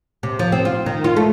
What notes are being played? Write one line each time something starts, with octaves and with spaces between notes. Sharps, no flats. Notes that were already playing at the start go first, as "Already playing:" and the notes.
C3
F3
C4
F4
D#3
F4
A3